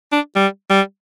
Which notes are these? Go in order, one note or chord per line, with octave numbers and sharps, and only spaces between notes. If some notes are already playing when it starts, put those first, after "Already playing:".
D4
G3
G3